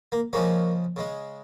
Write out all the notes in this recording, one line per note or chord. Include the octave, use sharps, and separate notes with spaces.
A#3
C#3 F3 G#3 A#3 C#4
C#3 G#3